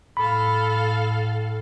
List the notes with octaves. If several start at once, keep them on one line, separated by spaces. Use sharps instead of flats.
A2 A4 F5 B5